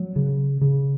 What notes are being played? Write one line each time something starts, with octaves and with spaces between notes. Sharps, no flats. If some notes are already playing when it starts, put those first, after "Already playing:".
Already playing: F#3
C#3
C#3